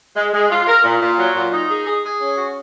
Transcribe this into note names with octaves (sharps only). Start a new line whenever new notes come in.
G#3
G#3
F4
A#4
A#2
A#2
F#3
A#2
D#4
G#4
G#4
G#4
C#4
F#4